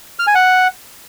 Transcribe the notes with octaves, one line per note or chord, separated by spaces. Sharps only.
F6
G#5
F#5